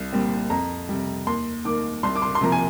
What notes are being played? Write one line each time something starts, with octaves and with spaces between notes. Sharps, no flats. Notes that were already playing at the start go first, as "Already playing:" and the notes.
Already playing: C2
A#2 G3 C4
F2 A#5
C3 G3
D#2 C6
D#3 A#3 D6
C2 C6
D6
C6
C6
C3 F3 A#3 A#5
G#5